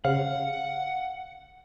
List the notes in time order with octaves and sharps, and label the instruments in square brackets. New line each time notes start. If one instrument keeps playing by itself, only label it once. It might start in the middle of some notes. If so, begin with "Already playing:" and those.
[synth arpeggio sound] C#3 [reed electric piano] F5 [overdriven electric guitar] F#5